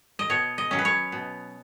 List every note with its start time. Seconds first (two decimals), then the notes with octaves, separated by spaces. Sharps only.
0.19 D#5
0.30 B2 C#5
0.58 D#5
0.71 F#3 C#4
0.79 B4
0.85 C#5
1.12 B2